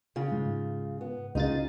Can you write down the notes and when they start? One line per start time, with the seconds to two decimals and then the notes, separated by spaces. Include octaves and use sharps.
0.16 C#3 F4
0.32 G#2
1.01 B3
1.35 C#2 D#4 F4 G#4 A6